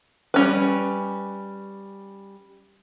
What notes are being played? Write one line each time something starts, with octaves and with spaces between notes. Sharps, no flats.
G3 C#4 B4